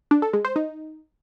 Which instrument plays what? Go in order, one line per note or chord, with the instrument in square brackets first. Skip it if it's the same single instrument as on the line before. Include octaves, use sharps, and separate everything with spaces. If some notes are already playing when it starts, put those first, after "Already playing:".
[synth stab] D4
A4
G#3
C5
D#4